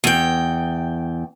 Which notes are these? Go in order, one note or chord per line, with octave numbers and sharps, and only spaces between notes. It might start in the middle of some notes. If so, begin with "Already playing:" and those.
E2 G5